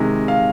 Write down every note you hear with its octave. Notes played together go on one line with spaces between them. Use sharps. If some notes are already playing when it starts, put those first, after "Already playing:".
Already playing: C3 D#3 G#3 G#5
F5